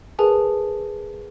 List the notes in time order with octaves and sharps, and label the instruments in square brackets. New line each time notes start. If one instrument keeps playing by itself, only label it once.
[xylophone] G#4 A#4 B4 G#5 A5